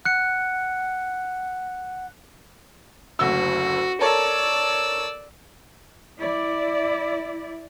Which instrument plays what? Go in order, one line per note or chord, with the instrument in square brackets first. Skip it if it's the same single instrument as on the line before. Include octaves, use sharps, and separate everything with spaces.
[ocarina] F#5 [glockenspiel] F#6 C#7
[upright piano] F#1 D2 E6 [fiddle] F#4
[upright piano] A4 A#4 C#5 [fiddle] D5 E6
[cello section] E4 D5